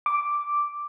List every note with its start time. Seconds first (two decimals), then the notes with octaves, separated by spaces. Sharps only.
0.06 D6